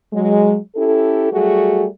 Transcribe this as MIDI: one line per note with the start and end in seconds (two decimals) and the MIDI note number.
0.13 0.57 54
0.13 0.57 56
0.76 1.27 61
0.76 1.27 64
0.76 1.27 67
0.76 1.27 69
1.31 1.85 54
1.31 1.85 55
1.31 1.85 57
1.31 1.85 66
1.31 1.85 68